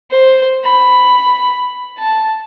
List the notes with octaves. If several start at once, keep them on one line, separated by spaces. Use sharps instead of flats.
C5
B5
A5